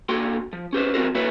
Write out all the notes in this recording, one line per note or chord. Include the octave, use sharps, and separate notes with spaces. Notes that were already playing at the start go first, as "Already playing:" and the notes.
D3 A#3 F#4 G5 C6
F3
C#4 G4 B4 C5
F3 C4 F#4 A#4 C5
A#3 E4 F#4 A4 B4 C#5